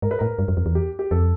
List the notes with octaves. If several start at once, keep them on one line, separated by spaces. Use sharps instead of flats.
G#2 A#4
B4
A2 A#4
G2
F#2
F2
E2
G4
G4
F2 A4